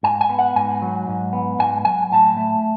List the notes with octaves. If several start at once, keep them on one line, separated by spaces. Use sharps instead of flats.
G#2 G#5
G#5
B3
F#5
G#2 G#5
F#3
G#2
B3
G#2 G#5
F#3 G#5
A2 A5
A3